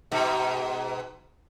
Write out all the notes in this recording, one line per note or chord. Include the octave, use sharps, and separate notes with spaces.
G#2 B2